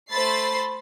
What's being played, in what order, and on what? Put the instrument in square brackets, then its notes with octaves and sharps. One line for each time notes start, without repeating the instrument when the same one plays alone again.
[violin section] A3 C5 B5 A6 C7